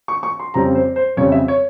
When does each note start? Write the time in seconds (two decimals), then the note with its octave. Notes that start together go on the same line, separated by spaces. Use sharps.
0.08 C#6
0.23 C#6
0.40 C6
0.54 F2 C#3 G3 C4 A#5
0.75 C5
0.96 C5
1.17 F2 C#3 G3 C4 C#5
1.32 E5
1.48 C#5